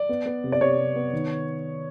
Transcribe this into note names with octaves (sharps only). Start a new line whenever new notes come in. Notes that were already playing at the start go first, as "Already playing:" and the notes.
Already playing: D5
B3
B3
C3
D5
C3 C#5
C3
B3
D#3